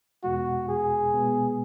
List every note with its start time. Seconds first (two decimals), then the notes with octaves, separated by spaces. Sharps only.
0.24 E2 B2 G#3 F#4
0.68 G#4
1.14 B2 G#3 B3